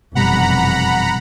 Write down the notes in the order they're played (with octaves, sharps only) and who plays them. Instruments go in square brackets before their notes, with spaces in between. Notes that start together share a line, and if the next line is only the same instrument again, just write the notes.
[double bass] F1 E3 [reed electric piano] F#2 B2 G3 [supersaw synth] F#5 A#5 B5